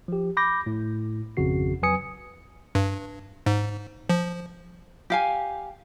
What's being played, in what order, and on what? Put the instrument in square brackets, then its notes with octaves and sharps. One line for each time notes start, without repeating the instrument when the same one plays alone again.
[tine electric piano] F3 G4
B5 D6 G6 A#6
A2
G#1 F2 C#3 F#4 C7
F2 F#3 B4 G#5 D#6 C#7
[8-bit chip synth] G2
G#2
F3
[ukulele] G4 F5 G#5